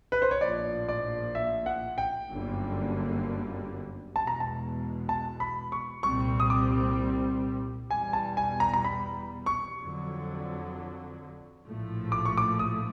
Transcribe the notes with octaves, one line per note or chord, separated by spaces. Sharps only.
B4
C5
C#5
A#1 A2 F3 A#3 D5
D5
E5
F#5
G5
G1 F#2 D3 G3 A#3
E2 B2 G#3 A5
A#5
A5
A5
B5
C#6
C2 A#2 G3 C4 C#6
D#6
D6
E2 B2 G3 G#5
A5
G#5
A#5
A#5
B5
C#6
F2 D3 F#3
A#1 A2 F3 A3
D6
C#6
D6
D#6